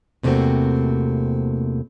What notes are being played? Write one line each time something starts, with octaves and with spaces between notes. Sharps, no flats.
E2 C3 A3 A#3 C4 F#4